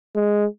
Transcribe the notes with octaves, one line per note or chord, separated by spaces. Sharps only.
G#3